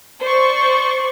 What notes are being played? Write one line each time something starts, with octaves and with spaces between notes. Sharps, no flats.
C5 D5 C#6